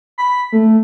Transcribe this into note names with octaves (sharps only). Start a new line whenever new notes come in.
B5
A3